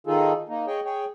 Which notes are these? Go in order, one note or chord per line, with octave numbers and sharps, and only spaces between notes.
D#3 D#4 F4 G#4 A4
A#3 D#4
G#4 C#5 D#5 G5
G#4 C#5 G5